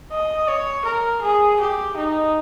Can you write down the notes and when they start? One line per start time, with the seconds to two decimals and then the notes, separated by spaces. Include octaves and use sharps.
0.12 D#5
0.48 C#5
0.85 A#4
1.22 G#4
1.60 G4
1.97 D#4